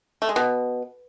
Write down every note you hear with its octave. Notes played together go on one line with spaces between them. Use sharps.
A3
G#3
B2